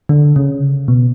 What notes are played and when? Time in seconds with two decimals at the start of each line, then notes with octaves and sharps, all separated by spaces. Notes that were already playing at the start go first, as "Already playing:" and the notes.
0.09 D3
0.36 C#3
0.88 B2